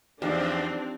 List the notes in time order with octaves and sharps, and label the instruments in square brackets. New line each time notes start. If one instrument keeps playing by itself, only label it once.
[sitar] E2 [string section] F3 C4 [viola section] D4 [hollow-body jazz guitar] D#4 F4 G4